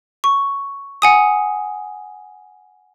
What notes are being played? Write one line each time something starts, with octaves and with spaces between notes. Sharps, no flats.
C#6
F#5 G#5 D#6